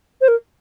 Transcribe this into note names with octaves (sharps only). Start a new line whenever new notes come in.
C5
A#4